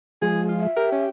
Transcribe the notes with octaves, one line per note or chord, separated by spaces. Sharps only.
F3 G#3 G#4
F4
E5
G4 A#4
C#4